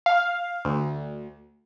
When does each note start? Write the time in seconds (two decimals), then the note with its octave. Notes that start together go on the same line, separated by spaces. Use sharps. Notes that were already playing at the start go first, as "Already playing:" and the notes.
0.06 F5
0.65 D2